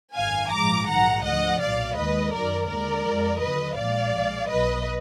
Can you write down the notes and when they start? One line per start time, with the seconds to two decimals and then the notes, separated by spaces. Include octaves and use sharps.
0.16 G#1 F#2 D#3 F5 G#5
0.52 A#1 G#2 F3 G#3 A#5 D6
0.88 A#1 G#2 D#3 F#3 F#5 A#5
1.24 D2 D3 F3 D#5 F#5
1.61 B1 A#2 F#3 D5 F5
1.96 D#2 D#3 G#3 B4 D#5
2.33 F#2 D#3 F#3 A#4 D5
2.69 D#2 D3 G#3 A#4 D5
3.05 F2 F3 G#3
3.41 D#2 D3 F#3 B4 D#5
3.77 A#1 A#2 F3 G#3 D5 F5
4.14 B1 A#2 G#3
4.49 B1 B2 F#3 B4 D#5